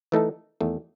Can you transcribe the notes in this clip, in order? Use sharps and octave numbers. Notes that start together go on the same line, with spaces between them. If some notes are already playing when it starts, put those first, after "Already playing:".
E3 A3 D#4 A4
E2 D#3 A3